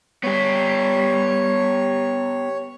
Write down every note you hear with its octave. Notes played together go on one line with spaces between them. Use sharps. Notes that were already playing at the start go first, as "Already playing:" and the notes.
G3 B3 G4 C#5